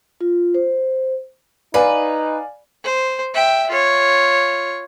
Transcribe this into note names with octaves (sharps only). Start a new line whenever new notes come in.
F4
C5
D#4 B4 D5 F5 G#5
C5
E5 G5
F4 C#5